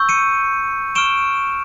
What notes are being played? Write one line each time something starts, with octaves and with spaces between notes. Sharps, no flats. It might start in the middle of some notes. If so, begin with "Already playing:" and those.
Already playing: C#6 E6 G6
C#7 D#7
C#6 F6 D7 E7